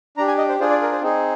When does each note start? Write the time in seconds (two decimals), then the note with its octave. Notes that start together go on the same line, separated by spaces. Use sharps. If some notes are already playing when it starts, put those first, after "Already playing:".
0.17 D4 A#5
0.20 G4
0.28 G#5
0.38 D#5
0.49 C5
0.60 D4 F4 G#4 C5
0.70 D5
0.82 A#4
0.92 C5
1.01 C4 D#4 G#4